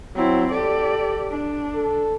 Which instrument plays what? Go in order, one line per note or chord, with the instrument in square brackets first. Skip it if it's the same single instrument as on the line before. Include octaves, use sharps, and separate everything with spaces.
[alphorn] F#3 [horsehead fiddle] C4 E4
[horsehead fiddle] G4 D5 [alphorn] A4
[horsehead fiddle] D4
[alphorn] A4